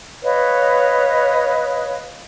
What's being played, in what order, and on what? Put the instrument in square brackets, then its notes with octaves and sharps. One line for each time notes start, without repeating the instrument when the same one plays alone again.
[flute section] B4 C#5 D#5 F5